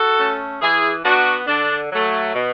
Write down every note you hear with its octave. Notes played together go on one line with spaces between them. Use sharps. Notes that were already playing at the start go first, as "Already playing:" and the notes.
Already playing: F#4 A4
A3 C#4
E3 E4 G#4
B3 D4 F#4
D3 D4
F#3 A3
B2